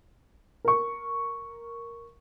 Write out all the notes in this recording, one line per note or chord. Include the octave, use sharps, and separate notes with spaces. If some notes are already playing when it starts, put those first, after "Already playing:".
A#4 C#6